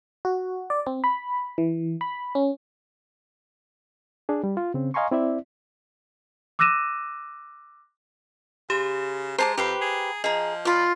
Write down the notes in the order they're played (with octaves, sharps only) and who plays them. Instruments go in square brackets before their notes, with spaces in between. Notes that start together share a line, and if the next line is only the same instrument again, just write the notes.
[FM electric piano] F#4
D5
C4
B5
E3
B5
C#4
[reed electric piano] D4 G#4
G3
F4
C#3 C4
D#5 F5 G#5 A#5 C6 C#6
C4 E4 D5 E5
[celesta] D6 E6 F#6 A#6 D#7 E7
[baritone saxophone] C#3 [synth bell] G4 E7
[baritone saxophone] G#3 [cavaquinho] C5 A5 D6 [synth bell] A#5
[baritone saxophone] F2 [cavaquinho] G4 B4 C5
[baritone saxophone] G#4
[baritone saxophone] F3 [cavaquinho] G#4 A#5 [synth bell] D#5
[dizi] F4 [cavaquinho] D5 B5